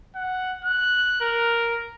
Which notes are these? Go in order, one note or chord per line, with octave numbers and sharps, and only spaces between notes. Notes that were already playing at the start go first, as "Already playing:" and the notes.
F#5
F#6
A#4